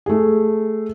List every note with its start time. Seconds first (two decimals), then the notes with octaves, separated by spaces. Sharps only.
0.06 A3 G#4